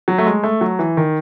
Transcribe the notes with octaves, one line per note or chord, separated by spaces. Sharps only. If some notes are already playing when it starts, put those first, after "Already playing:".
F#3
A3
G#3
A3
F#3
E3
D#3